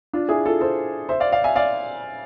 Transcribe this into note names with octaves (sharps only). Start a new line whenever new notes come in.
D4 F4
E4 G#4
F4 A4
A4 C5
C5 E5
D5 F5
D5 F5
E5 G#5
D5 F5